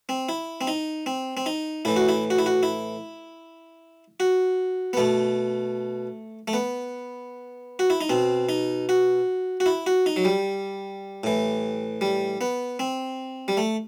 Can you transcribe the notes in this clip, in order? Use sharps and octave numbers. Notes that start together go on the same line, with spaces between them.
C4
E4
C4
D#4
C4
C4
D#4
A2 E3 E4
F#4
E4
F#4
E4
F#4
E4
F#4
B3
B2 A3
A3
B3
F#4
E4
D#4
B2 C4
D#4
F#4
F#4
E4
F#4
D#4
F#3
G3
A2 E3
G3
B3
C4
G3
A3